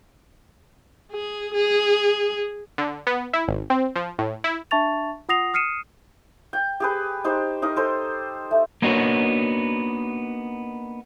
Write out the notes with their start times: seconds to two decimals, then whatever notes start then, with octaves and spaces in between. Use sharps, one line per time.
1.12 G#4
1.54 G#4
2.78 D3
3.07 B3
3.33 E4
3.48 G#1
3.70 C4
3.96 F3
4.19 A2
4.44 E4
4.71 D4 E5 A5 C#6 A6 F7
5.29 F4 F#5 D#6 A#6 C7 F7
5.54 D#6 F6 C7 C#7 D#7 E7
6.53 G5
6.80 G4 G#4 B4
7.24 D#4 G4 C5
7.62 D#4 A#4 D#5
7.76 A4 C5 C6
8.51 A3
8.82 A#3 B3 D4 D#4 F#4 C#5